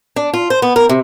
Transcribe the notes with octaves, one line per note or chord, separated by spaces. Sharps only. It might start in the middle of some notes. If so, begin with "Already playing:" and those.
D4
F4
C5
B3
A#4
C3